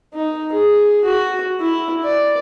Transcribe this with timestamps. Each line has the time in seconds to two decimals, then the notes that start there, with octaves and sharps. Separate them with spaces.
0.14 D#4
0.52 G#4
1.05 F#4
1.61 E4
2.04 D5